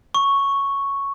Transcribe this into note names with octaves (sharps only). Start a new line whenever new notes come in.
C#6